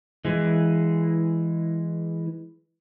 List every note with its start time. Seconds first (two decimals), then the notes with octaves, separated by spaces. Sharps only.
0.25 E3 G#3